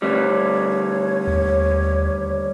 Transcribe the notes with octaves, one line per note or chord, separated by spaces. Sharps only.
D2 G3 C#5
D#2